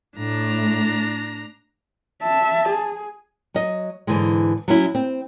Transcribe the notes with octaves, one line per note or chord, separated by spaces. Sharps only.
A2 D4 A#5
E5 A5
G#4
F#3 D#5
G#2 D3 E3 G#3
F#3 C#4 E4
C4